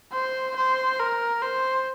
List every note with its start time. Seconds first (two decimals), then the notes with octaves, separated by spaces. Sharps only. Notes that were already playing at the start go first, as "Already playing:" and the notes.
0.13 C5
0.56 C5
1.00 A#4
1.42 C5